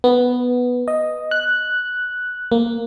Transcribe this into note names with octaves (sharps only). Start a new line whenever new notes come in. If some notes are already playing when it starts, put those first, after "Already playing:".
B3
D#5
F#6
A#3